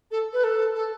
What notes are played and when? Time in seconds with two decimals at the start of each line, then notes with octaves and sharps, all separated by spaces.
0.11 A4
0.33 B4
0.43 A4
0.74 A4